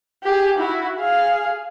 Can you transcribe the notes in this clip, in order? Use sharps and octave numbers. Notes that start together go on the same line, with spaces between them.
G4 G#4
E4 F#4
G#4 F5